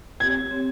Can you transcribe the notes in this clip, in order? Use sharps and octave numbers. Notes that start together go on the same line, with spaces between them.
C4 G4 C#5 G#6
C4 G4 C#5